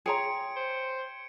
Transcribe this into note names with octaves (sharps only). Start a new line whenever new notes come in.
G#4 C#5 G5 A#5 C6 G#6 C#7 D7
C5